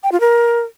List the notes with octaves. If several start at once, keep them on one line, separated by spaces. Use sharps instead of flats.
G5
F4
A#4